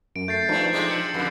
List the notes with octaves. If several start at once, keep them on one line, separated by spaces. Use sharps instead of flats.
F#2 D7
A3 G6 A6 C7
G2 F3 A3 D4 D#4
C3 G#3 A3
C#7 F#7
F2 D3